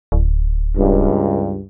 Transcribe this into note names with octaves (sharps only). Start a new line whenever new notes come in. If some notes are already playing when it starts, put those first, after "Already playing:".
D1
C#2 G2